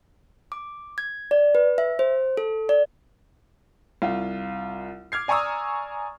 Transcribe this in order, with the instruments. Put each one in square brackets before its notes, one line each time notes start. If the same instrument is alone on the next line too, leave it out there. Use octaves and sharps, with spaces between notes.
[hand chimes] D6
G#6
D5
B4
E5
C5
A4
D5
[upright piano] C2 F4
D6 F6 G#6 C7
D5 G#5 A#5 C#6 D#6 E6